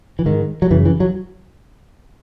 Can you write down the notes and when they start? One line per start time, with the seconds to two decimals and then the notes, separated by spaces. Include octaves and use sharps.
0.19 E3
0.26 G#2 D#3
0.62 F#3
0.71 F#2 C#3 E3
0.85 E3
1.00 F#3